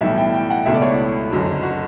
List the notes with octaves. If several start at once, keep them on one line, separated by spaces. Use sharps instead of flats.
B1 A2 E3 G3 E5
G5
G5
F#5
C#2 B2 A3 E5
D5
C#5
E4
F#1 F#2 D3 F#3
F#4